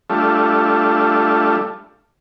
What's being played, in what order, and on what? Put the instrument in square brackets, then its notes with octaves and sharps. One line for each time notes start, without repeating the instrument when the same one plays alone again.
[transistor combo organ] G3 A3 D4 F4 A4 E5